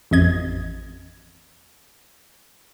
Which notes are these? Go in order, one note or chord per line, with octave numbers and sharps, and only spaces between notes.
A1 F2 D#5 G#6